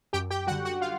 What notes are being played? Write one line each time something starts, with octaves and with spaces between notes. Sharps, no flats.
F#2 G4 G5
G4 G5
D3 G3 F#4 F#5
F#4 F#5
F4 F5